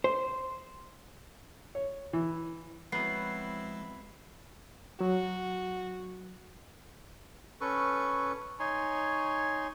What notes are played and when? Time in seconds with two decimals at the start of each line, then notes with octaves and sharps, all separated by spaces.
0.04 C5
1.75 C#5
2.13 E3
2.92 F3 F#3 G#3 B3 C4 E4 F#6 C7
5.01 F#3 F#4
7.61 C#4 A4 B4 C#6
8.60 D#4 C#5 G#5 C6